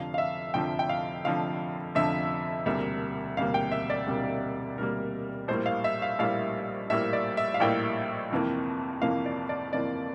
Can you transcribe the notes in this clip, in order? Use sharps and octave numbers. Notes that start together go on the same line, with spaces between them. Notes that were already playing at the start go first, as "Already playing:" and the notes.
Already playing: F1 F2 D3 F3 F5
F5
E5
F1 F2 D3 F3 G5
G5
F5
F1 F2 D3 F3 F5
F1 F2 D3 F3 E5
E1 D2 C3 G3 A#3 E5
E1 D2 C3 G3 A#3 F5
G5
E5
D5
E1 D2 C3 G3 A#3
E1 D2 C3 G3 A#3 A#4
A#1 A2 G3 A#3 C5
F5
E5
F5
A#1 A2 G3 A#3 F5
A#1 A2 G3 A#3 E5
D5
E5
F5
A#1 A2 G3 A#3 G5
G1 F2 C3 E3 A#3
G1 F2 C3 E3 A#3 F5
D5
D5
G1 F2 C3 E3 A#3 D5